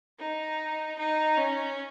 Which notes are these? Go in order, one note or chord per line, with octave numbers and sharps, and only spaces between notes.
D#4
D#4
C#4